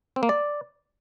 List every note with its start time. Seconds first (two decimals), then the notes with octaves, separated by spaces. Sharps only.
0.16 C4
0.23 A#3
0.29 D5